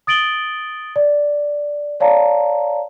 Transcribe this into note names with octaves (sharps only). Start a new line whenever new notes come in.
D#6 A6 D7 F#7 G7
D5
C#5 D5 F5 A5 A#5